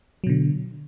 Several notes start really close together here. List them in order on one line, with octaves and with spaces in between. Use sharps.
F#3 B2 D3